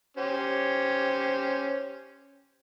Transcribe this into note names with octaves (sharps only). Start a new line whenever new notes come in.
C#4 G4 C5